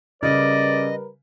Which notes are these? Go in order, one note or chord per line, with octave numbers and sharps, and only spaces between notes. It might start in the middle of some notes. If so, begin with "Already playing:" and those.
C#3 G3 A#4 B4 D5 D#5